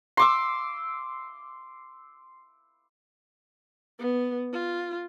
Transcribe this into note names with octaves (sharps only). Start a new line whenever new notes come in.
C6 D6 E6
B3
F4